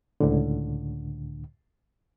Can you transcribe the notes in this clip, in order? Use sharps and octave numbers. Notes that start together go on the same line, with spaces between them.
C#2 A2 D3